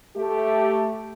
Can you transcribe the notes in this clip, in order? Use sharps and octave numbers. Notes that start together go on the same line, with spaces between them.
A3 G4